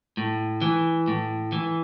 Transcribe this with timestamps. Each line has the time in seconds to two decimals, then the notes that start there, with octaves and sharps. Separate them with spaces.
0.17 A2
0.62 E3
1.08 A2
1.52 E3